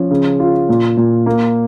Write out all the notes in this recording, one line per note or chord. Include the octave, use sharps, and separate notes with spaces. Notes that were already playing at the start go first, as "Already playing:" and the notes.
Already playing: F3 C#4
C#3
F4
A#2
A#2
A#3